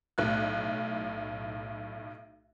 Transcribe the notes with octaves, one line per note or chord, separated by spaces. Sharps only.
B1 A2 F#6